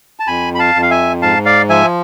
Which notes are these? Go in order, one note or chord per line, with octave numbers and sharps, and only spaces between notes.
A5
F2 G#5 B5
B5
F5 A5
F2
F5
E5 G#5
G#2 F5 A5
D5 F5
F3 E5 G#5